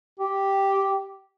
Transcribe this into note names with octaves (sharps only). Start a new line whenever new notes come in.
G4